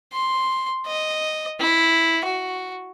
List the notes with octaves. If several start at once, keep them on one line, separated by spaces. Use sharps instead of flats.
C6
D#5
E4
F#4